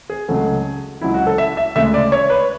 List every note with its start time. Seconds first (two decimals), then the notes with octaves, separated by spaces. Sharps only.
0.10 G#4
0.28 C#2 C#3 F#3 A3
1.01 C#2 C#3 F#3 E4
1.14 F#4
1.27 A4
1.38 E5
1.57 E5
1.76 D2 C#3 G#3 E5
1.94 D5
2.12 C#5
2.30 B4